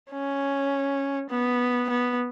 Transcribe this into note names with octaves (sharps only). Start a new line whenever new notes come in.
C#4
B3
B3